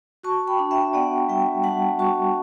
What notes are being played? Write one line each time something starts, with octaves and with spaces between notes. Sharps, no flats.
F#4 A5 C#6
G5 B5
D4
E5 G5
B3 D5 F#5
G3 E5 G5
G3 F#5 A5
F#4 A5 C#6